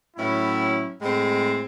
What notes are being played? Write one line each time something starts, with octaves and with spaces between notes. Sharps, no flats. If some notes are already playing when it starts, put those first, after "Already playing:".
A2 F#3 C#4 E4
A2 G#3 C4